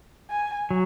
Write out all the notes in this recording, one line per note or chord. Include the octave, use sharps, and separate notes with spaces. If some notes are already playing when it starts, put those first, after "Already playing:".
G#5
F#3